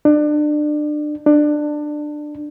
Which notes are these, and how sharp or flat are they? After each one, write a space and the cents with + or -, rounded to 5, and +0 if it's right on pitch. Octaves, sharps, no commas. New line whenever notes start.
D4 +30
D4 +20